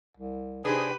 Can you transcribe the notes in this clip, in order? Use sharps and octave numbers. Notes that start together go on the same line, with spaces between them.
C2
C3 D4 D#4 G4 G#4 B4 C5